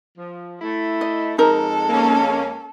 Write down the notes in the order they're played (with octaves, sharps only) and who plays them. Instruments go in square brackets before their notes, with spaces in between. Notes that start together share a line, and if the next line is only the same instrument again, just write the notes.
[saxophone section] F3
A3 E4
[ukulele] D#5
[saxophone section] F2 G#3 [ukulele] D#4 A#4 [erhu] A4
[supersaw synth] A#3 C#4